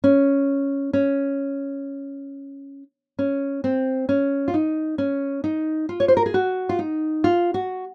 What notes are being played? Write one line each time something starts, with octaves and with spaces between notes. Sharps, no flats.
C#4
C#4
C#4
C4
C#4
F4
D#4
C#4
D#4
F4
C#5
C5
A#4
G#4
F#4
F4
D#4
F4
F#4